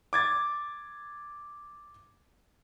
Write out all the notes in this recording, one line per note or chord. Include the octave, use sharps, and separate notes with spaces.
D6 G#6 A6